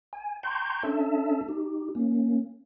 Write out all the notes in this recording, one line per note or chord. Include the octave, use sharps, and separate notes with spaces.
G#5
G5 A5 A#5 C6 C#6 G6
C#4 D4 A4 E5 A5
D#4 G4
A#3 C#4